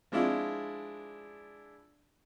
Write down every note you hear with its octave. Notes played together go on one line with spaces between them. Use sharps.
F3 G#3 D4 E4 F4